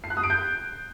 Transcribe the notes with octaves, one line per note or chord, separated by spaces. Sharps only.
C7
F#6
D#6
D7
G6